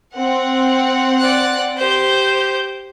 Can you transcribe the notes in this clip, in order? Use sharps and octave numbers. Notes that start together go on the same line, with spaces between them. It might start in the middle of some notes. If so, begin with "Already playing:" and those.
C4 F#5
D5 F#6
G4 C5 G6